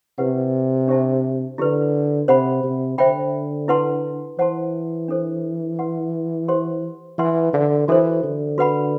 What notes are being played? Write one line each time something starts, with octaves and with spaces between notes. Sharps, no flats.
C3 E4 G4 B4 F#5
D4 G4 C5 E5 A5
D3 E4 G4 B4
C3 C5 F#5 B5
C3
D3 C5 E5 G5 B5
E4 B4 F#5 A5 C6
E3 C5 F#5 A5 C6
D4 A4 C5
B4 F#5 C6
G4 C5 F#5 C6
E3 B4 F#5 C6
D3
E3 F#4 A4 C5
D3
F#4 B4 F#5 B5